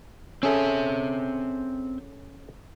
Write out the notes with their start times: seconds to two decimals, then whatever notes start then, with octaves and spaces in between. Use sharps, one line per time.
0.43 C4 C#4 G#4 A4 E5